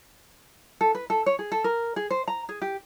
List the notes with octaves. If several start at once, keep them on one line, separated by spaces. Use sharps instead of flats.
A4
B4
A4
C#5
G#4
A4
A#4
G#4
C5
A#5
G#4
G4